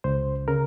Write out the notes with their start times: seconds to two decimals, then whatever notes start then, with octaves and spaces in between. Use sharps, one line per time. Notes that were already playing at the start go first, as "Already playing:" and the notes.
0.04 C#2 C5
0.48 C#3 A#4